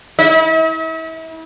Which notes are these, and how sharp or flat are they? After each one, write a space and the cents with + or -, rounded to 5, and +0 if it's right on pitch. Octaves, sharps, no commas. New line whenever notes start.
E4 -35 E5 -45